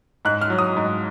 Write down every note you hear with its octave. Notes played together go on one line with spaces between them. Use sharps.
G#2 F#6
F6
F#3
D#6
G#2